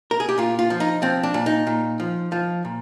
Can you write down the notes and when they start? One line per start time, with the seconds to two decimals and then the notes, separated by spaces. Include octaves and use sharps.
0.11 A#4
0.20 G#4
0.29 G4
0.38 A#2 F4
0.59 F4
0.70 F3
0.80 D#4
1.02 F3 C4
1.23 D4
1.34 A#2
1.46 D#4
1.67 A#2
2.00 F3
2.32 F3
2.65 A#2